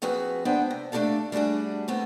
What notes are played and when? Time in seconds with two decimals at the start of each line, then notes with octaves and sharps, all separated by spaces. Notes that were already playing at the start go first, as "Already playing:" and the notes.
0.02 F3 C4 F#4 G#4 B4
0.45 G#3 B3 D4 C5 E5 G5
0.71 C3
0.92 A3 D4 E4 G4 A4 F5
1.32 G3 A3 D4 F#4 G#4
1.88 A3 B3 C4